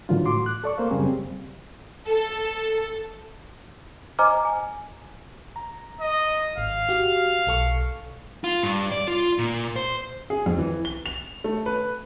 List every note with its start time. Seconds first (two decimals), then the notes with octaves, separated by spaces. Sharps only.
0.09 G#2 D3 E3 F#3 F4
0.25 A2 F#4 C6 D6
0.46 F#6
0.64 A4 D5 C#6
0.77 A#3 C5 F5
0.91 F#2 C#3 G3 C4 G#4
2.08 A4
4.19 C5 D#5 G#5 A#5 D6 F6
4.45 G#5
5.56 A#5
6.00 D#5
6.58 G#1 F5
6.89 F#4 G4
7.47 B1 A4 C#6
8.44 F4
8.63 G2
8.92 D5
9.08 F4
9.39 A#2
9.76 C5
10.30 G#4
10.46 F2
10.58 E3
10.85 G7
11.06 F7
11.44 A3
11.66 B4